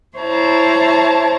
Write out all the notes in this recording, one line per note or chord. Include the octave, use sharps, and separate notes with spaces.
E4 C5 C#5 A5 A#5